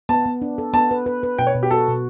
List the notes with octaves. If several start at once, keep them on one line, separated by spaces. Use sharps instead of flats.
B3 A5
B3
D4
A4
B3 A5
B4
B4
B4
B2 G5
C#5
B2
G4
F#4 A4
B2